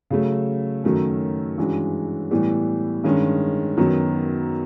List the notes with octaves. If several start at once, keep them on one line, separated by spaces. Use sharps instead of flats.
C#3 F#3 A3
F#2 D#3 F#3 A3 C#4
G2 E3 G#3 C#4 F#4
A2 E3 G3 B3
G2 D#3 G#3 C#4
F#2 D#3 F#3 B3